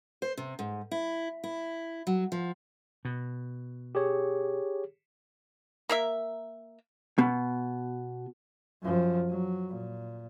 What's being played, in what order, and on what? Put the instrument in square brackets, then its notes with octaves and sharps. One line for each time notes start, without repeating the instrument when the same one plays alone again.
[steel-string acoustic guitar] C5
C3
G#2
E4
E4
F#3
F3
[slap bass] B2
[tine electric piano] G4 G#4 C#5
[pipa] A#3 A#4 E5
[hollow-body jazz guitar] B2
[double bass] F#2 F3
F#3
A#2